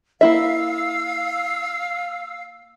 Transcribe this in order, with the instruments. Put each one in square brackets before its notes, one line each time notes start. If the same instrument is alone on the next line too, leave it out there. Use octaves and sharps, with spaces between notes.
[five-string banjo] A#3 E4 E5 [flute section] F5 E6